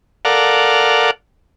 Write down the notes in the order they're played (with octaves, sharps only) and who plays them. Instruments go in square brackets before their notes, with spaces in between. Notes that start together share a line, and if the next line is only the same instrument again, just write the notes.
[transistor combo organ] A4 A#4 D5 F5 F#5